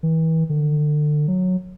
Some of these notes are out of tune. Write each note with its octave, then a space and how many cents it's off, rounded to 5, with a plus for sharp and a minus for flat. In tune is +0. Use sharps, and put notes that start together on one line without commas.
E3 -35
D3 +30
F#3 -10